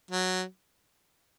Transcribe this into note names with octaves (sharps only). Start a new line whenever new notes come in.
F#3